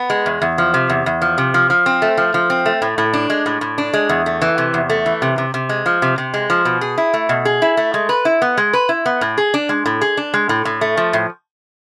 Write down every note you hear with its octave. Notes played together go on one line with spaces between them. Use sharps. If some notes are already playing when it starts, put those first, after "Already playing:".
Already playing: B3
G#3
E2
E2
F3
C3
E2
E2
F3
C3
F3
F3
C4
A3
F3
F3
C4
A3
A2
A2
D4
G#3
A2
A2
D4
G#3
E2
A3
E3
C3
E2
A3
E3
C3
C3
C3
G#3
F3
C3
C3
G#3
F3
B2
G#4
E4
A3
B2
G#4
E4
A3
G#3
B4
E4
B3
G#3
B4
E4
B3
A2
G#4
D4
G#3
A2
G#4
D4
G#3
A2
A2
A3
F3
A2